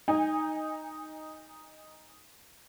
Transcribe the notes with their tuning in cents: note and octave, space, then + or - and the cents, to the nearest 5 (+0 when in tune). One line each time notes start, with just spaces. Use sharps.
D#4 +0 G#5 -25